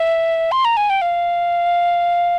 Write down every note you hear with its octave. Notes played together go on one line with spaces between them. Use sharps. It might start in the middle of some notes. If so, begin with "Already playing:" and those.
Already playing: E5
C6
A#5
G#5
G5
F5